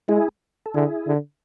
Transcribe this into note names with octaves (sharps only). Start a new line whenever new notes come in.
G#3 E4 G#4
A4
D3 E4 G#4
D3